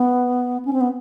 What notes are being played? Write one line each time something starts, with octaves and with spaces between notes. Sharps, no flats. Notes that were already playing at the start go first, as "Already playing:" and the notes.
Already playing: B3
C#4
C4
B3